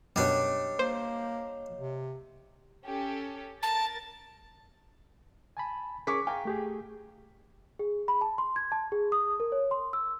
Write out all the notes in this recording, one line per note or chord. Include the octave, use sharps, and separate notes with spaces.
F#2 B2 G3 D4 C#5 D#5
A#3 C5
C3
C#4 G4 A4
A#4 A5 A6
G#5 A5 B5
C#4 G#4 A#4 C#6 D6 B6
F5 G5 G#5 A#5
A3 G4 G#4
G#4
B5
A5
C6
G#6
A5
G#4
D#6
A#4
C#5
C6
E6